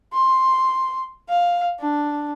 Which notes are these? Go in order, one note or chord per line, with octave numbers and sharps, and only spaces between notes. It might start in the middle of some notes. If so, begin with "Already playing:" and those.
C6
F5
D4